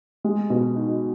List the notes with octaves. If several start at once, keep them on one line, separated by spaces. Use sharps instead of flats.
G#3
B2
D#4